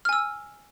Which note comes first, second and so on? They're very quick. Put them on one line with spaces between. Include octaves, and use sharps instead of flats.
F6 G#5 E6